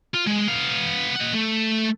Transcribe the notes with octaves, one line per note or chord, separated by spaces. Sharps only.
F4
G#3
B3 F5
D#5 F#5
A3